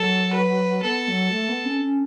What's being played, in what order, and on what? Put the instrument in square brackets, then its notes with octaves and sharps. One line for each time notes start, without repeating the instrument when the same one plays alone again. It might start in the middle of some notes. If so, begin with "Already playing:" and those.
Already playing: [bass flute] F#3 [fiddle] A4
[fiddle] B4
[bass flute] B3 [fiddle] A4
[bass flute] F#3
A3
B3
C#4
C#4